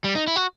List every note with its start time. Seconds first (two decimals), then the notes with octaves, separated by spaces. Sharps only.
0.04 G3
0.15 D#4
0.27 E4
0.36 F#4